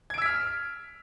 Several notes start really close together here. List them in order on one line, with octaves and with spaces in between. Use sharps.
G#6 D7 E6 B6 F6